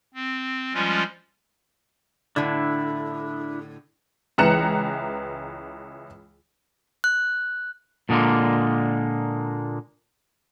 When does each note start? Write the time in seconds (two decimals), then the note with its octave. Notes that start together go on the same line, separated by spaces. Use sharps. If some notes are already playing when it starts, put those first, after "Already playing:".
0.14 C4
0.74 F3 G3 G#3 C#4 F4
2.36 A2 D3 D4 E4
4.38 C#2 E3 A#5 F#6 C#7 E7
7.04 F#6
8.09 A#2 D3 G#3 A#3